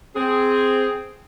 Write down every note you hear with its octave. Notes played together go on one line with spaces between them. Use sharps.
C4 G#4